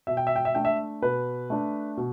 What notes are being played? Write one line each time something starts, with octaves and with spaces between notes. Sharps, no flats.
B2 E5
G5
E5
G5
E5
A3 D4 G5
E5
B2 B4
A3 D4
B2